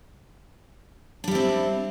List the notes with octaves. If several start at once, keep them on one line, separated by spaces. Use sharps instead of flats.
G3 C4 D4 E4